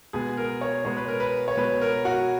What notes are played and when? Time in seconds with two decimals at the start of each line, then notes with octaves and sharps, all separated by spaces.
0.13 B2 G#3 B3 G#4
0.37 A#4
0.61 C#5
0.85 B2 G#3 B3 C#5
0.97 B4
1.08 A#4
1.20 B4
1.48 C#5
1.57 B2 G#3 B3 B4
1.81 A#4
2.05 F#4